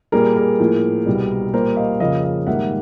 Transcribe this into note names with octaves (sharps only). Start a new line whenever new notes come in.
A#2 G3 A#3 G#4 A#4
G#4 A#4
A2 F3 A#3
C2 B2 G3
A#2 G3 A#3 A#4 C5
D#5 F5
F2 C#3 F3 A#3 D#5 F5
D#5 F5
G#2 D#3 G3 A#3 E5 F#5